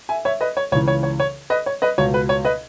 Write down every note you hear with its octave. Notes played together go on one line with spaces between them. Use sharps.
E5 G#5
C#5 E5
B4 D#5
C#5
C#2 C#3 E3 C#5
C#5
C#5
C#5
B4 D#5
C#5
B4 D#5
C#2 B2 C#5
B4
C#5
B4 D#5